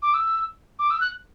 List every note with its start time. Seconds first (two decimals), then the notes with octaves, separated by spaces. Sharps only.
0.02 D6
0.14 E6
0.79 D6
0.90 E6
1.01 F#6